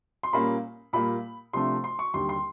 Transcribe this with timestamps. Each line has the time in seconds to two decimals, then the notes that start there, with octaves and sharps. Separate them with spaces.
0.23 C6
0.33 A#2 G3 A#3 C#4 B5
0.93 A#2 G3 A#3 B5
1.53 C3 F3 A3 D4 C6
1.84 C6
1.99 C#6
2.14 D#2 D3 G3 C6
2.29 C6